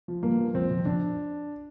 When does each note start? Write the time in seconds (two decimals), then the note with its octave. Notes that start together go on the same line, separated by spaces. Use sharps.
0.08 F3
0.23 G2 A#3
0.39 F3
0.54 F2 C4
0.71 F2
0.85 F2 D4